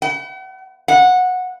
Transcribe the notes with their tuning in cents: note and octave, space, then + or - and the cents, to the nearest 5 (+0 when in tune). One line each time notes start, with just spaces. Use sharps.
F#5 +45
F#5 -15